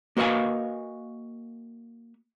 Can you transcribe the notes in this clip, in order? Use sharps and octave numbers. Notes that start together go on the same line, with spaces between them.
A#3 F#4 B4 D#5 F5 G#5